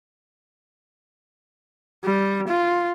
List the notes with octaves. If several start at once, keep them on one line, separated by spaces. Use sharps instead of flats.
G3
F4